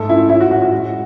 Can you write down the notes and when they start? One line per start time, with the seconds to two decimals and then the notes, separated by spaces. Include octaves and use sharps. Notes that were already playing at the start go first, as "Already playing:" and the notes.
Already playing: G#2 A3 A4
0.09 F#2 E4
0.29 C#4 E4
0.41 F#4
0.51 A2 F#4
0.62 F#4
0.73 G#3